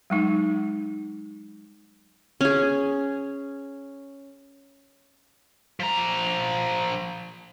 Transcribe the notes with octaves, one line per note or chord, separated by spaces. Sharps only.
F#3 G#3 D#4
C#4 G#4
F3 A#5